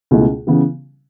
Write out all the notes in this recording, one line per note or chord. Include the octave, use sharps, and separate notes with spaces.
C#2 B2 A3 E4
C#3 E3 B3